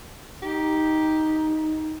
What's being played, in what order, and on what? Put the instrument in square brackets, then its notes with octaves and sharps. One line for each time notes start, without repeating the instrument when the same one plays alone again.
[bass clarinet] D#4 [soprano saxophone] G4